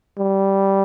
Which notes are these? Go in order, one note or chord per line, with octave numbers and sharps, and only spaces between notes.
G3